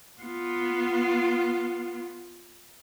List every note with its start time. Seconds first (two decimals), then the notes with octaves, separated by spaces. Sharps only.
0.21 B3 F4